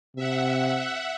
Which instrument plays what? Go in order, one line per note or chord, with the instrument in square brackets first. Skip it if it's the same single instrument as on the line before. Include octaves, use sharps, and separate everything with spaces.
[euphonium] C3 [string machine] E5 F#5